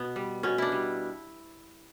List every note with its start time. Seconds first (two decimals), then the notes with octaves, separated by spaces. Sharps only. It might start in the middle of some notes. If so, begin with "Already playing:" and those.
Already playing: B2 B3
0.16 G3
0.43 B2 C#4
0.58 D4 E4
0.72 G3